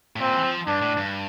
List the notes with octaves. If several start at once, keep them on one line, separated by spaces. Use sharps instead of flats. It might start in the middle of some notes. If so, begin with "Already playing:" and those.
A2
A#2 C4
E3
F3
G2 D4
A2
G2